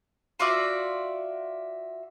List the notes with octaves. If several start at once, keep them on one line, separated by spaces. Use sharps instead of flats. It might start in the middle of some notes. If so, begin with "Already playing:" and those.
F4 F#4 D5 E5